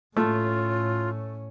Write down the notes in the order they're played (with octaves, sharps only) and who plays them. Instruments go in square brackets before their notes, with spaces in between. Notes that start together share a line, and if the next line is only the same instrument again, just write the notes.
[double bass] A2 C#4 [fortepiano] A3 [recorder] F4